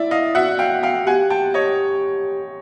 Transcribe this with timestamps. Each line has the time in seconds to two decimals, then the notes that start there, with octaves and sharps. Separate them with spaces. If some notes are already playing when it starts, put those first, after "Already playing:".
Already playing: E4 D5 E5
0.11 D#5 F5
0.35 F#4 E5 F#5
0.59 F5 G5
0.83 F5 G5
1.06 G4 F#5 G#5
1.30 G5 A5
1.54 C#5 D#5